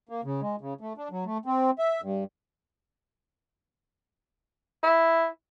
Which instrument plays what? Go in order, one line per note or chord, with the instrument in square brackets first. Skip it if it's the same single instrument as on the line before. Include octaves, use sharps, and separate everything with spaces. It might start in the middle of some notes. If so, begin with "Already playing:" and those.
[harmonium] A#3
C#3
G#3
C#3
A3
D4
F#3
A3
C4
E5
G2
[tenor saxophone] E4